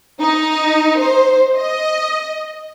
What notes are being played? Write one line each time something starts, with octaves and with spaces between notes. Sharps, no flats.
D#4
C5
D#5